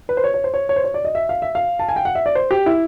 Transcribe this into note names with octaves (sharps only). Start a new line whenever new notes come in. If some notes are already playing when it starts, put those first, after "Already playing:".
B4
C5
C#5
C#5
C5
C#5
C#5
C5
C#5
D5
D#5
E5
F5
E5
F5
A5
G#5
G5
F#5
E5
D5
C5
G4
E4